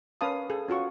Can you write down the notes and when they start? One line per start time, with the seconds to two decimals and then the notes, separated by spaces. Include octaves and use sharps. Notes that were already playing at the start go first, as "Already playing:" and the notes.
0.21 C#4 A#4 B4 F5 A5 D#6
0.50 G#4 A4
0.68 C#4 F4 F#4 C#6